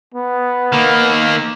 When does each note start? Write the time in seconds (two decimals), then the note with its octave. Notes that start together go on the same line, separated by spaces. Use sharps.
0.14 B3
0.72 D#3 A#3